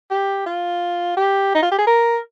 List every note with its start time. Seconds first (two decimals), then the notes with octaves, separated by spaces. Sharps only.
0.11 G4
0.46 F4
1.17 G4
1.55 D#4
1.62 F4
1.71 G4
1.78 G#4
1.87 A#4